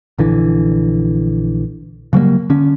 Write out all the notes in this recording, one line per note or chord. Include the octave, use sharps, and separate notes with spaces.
A#1 D3 E3
C#3 F#3 G3 A#3
D3 C#4